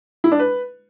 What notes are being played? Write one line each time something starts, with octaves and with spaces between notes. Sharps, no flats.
E4
D4
B4